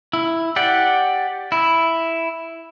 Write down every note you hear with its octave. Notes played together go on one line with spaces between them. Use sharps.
E4
G4 D5 F#5
E4